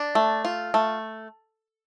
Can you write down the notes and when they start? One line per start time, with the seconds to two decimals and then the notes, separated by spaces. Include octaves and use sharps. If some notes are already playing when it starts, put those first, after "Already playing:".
Already playing: D4
0.15 A3
0.45 F4
0.74 A3